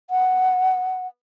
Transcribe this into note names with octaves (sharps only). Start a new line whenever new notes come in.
F#5